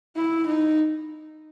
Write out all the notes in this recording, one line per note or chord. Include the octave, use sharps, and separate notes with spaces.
E4
D#4